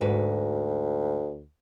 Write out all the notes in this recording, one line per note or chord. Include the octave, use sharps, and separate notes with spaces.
D2 G#2 F#4 B4